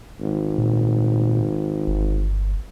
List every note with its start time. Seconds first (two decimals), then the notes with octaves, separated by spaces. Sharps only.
0.20 G#1
0.58 A#2
1.87 G1